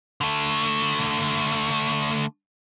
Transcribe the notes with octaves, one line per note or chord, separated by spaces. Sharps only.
D3 A3